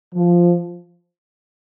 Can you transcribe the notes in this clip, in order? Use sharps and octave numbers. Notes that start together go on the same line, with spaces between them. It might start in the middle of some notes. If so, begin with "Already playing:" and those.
F3